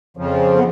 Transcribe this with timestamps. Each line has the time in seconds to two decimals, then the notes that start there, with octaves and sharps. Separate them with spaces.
0.17 F2 C#3 F3
0.56 B3